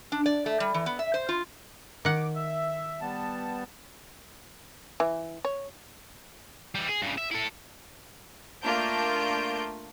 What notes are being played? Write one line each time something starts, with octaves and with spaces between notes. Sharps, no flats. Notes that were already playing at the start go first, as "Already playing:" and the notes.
D4
D5
A3
G3
E3
B3
E5
C5
F4
D#3 F#5 D6
E5
G3 B3 A5
E3
C#5
E3 G3
G#4
G2 C#3
E5
E4 A4
A3 A#3 D4 F4 G6 D7